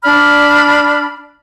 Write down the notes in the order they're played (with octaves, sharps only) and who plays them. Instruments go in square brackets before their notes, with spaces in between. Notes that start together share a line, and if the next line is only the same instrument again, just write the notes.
[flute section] D4 D5 B5 F6